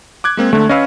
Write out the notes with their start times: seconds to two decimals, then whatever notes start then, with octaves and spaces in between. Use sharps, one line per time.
0.24 D6 F#6 G#6
0.37 G#3 A#3 C4
0.53 D2 D3 A3
0.69 C#4 B4 D#5 F5 E6